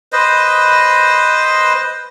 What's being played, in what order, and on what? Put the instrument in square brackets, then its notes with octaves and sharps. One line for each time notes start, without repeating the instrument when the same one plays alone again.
[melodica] B4 C5 D#5